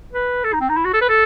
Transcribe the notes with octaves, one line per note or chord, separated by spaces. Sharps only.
B4
A4
D#4
C4
D#4
E4
F#4
A4
B4
A4